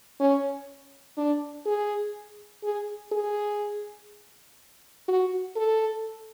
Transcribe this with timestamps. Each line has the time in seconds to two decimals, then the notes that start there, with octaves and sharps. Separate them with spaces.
0.20 C#4
1.17 D4
1.66 G#4
2.63 G#4
3.12 G#4
5.08 F#4
5.56 A4